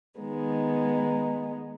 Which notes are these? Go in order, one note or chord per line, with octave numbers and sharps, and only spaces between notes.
D#3 G#3 B3 D#4